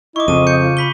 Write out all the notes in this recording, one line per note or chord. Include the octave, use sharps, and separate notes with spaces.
E4 D#5 C#6 D6
F2 C#3 A5 D#7
G6 C#7
F4
B5 B6 G7